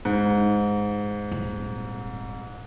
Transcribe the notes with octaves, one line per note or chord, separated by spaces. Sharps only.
G#2
D#1 C4